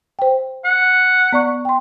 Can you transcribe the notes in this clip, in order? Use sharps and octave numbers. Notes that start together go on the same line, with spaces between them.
C5 G5
F#5
B3 D5 C#6
G5 C6